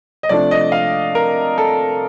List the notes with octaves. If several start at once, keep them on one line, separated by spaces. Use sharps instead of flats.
D#5
C3 F3 A3 D4 D5
D#5
F5
A#4
A4